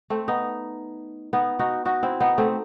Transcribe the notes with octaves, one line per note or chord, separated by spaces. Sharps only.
A3 C4
B3 D#4
B3 D#4
D#4 F#4
D#4 F#4
C4 E4
B3 D#4
A3 C4